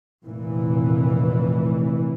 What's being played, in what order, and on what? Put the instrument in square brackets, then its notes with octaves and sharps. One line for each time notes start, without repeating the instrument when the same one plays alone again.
[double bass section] F1 A#2 E3